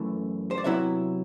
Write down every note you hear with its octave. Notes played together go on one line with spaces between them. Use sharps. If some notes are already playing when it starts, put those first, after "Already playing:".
Already playing: F#2 E3 A3 E4
C5
D5
C3 F#3 B3 E4 E5